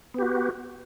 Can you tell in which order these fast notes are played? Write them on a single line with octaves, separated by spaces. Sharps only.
B3 G4 F#4